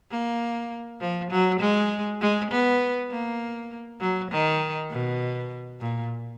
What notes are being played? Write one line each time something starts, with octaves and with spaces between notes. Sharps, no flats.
A#3
F3
F#3
G#3
G#3
B3
A#3
F#3
D#3
B2
A#2